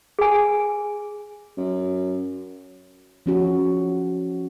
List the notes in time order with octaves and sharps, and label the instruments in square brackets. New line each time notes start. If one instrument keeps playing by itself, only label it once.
[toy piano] G#4 G#5
[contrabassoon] F#2
[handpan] F3 C#4 F#4